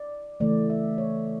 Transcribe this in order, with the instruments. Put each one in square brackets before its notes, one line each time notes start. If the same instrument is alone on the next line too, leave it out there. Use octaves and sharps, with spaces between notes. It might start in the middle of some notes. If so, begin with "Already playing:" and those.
Already playing: [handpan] D5
C#3 E3 A3 D5
E5
C#5